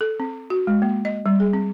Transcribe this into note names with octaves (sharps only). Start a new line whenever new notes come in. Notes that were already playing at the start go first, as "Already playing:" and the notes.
A4
C4
F#4
G#3
A#3
D#5
G3
G#4
C4